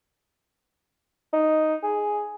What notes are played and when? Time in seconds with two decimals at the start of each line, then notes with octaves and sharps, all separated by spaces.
1.33 D#4
1.83 G#4